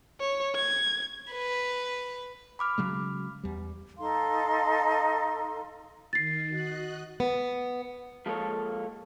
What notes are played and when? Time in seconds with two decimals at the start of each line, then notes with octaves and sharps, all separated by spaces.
0.20 C#5
0.56 G#6
1.31 B4
2.59 B5 D6 F6
2.78 C#3 F#3 G#3
3.44 E2 G3
3.99 D#4 A4 F5 C6
6.13 D#3 A6 C7
6.49 F#4 D#5 F#6
7.20 B3
8.26 F3 G#3 A#3 A4 C#5